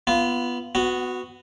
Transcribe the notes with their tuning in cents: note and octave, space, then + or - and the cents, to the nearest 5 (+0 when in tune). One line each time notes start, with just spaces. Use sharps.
B3 -5 F4 -20
B3 +20 F#4 -10